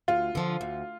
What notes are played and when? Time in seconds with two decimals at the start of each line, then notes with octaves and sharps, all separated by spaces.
0.08 D2 F4
0.35 D3 F3
0.61 D2